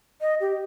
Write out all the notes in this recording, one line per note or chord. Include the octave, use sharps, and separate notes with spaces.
D#5
G4